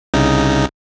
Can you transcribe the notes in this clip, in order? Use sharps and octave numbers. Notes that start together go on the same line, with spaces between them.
C2 C#3 D#4